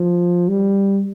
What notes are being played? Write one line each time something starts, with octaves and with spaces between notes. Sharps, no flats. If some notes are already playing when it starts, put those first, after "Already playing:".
Already playing: F3
G3